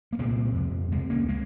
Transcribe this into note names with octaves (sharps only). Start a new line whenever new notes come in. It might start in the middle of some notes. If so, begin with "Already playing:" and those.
A#3
C2 A#2 G#3 C4
F2 C3
C#2 C3 G#3 C4
A#3 C#4
G#3 C4